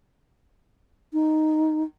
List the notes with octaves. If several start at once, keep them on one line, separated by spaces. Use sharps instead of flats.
D#4